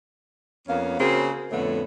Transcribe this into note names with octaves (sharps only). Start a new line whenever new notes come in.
F2 A#3 B3 C#4 F5
C#3 A#3 C4 F#4 G#4
F2 A2 D3 A3 B3